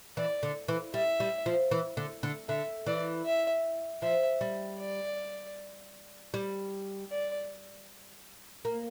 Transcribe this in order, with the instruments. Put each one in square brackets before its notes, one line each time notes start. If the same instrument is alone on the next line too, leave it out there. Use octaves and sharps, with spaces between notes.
[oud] E3 [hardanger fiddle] D5
[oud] D3
E3
[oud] G3 [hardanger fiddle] E5
[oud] G3
F3
E3
D3
D3
[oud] D3 [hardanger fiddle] E5
[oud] E3 [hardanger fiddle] D5
[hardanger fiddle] E5
[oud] F3 [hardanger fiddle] E5
[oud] G3
[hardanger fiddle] D5
[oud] G3
[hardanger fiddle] D5
[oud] A#3